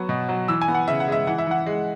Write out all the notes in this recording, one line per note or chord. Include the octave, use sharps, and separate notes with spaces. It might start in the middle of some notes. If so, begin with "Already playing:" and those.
Already playing: F#3 B3 C#6
B2
F#3
E3 E6
G#5
B3
F#5
C#3 E5
F#5
G#3 E5
E3 F#5
E5
E3 F#5
G#3